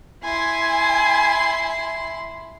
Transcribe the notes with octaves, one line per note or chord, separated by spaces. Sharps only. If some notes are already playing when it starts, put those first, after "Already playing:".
E4 G#5 C6